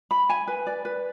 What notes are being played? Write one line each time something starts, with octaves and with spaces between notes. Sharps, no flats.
B5
G#5
B4
D5
B4